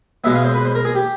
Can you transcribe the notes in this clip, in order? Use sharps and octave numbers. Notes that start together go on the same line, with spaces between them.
B2 G#3 B3 E5
F5
C5
B4
C5
A#4
G#4
G4